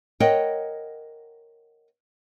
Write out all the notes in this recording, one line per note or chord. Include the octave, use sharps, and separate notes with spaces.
A#4 C#5 D#5 F#5 G5